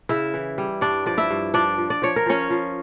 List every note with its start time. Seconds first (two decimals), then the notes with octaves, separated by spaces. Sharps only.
0.09 C#3 E4 E5
0.34 E3
0.58 G3
0.81 G2 D4 D5
1.06 F3 D5
1.18 E4 E5
1.30 G2
1.54 F3 D4 D5
1.78 F3
1.90 D5
2.02 F3 C#5
2.16 A#4
2.26 F3 C#4 C#5
2.50 F3